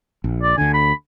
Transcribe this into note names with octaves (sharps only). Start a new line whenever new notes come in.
A#1
D5
D2 D3 G#5
B5